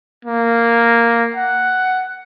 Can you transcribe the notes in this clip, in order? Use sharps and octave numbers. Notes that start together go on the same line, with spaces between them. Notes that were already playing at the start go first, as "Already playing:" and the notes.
A#3
F#5